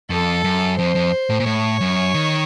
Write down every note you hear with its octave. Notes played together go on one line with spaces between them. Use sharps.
F2 A4
F#2
F2 C5
F2
A2
A#2
A2 C#5
F#2
D#3